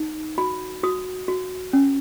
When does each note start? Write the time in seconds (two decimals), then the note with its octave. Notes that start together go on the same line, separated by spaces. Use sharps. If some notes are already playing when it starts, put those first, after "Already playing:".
Already playing: D#4
0.38 F#4 B5
0.83 F#4 D#6
1.28 F#4
1.73 C#4